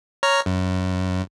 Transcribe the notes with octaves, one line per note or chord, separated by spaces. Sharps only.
C#5 A#5 F6
F#2